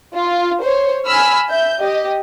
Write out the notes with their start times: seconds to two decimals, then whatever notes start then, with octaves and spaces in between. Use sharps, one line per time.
0.13 F4
0.62 C5 C#5
1.05 G#5 B5 E6 F6
1.50 E5 G6
1.79 G4 D#5